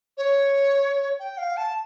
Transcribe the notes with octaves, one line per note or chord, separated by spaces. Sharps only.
C#5
G5
F5
A5